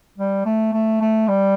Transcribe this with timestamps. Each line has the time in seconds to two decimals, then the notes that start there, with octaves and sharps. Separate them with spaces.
0.18 G3
0.46 A3
0.73 A3
1.01 A3
1.28 G3